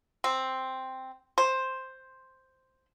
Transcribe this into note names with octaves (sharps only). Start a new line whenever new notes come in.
C4
C5